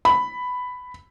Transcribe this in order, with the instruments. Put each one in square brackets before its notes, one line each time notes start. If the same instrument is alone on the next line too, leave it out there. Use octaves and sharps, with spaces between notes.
[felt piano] B5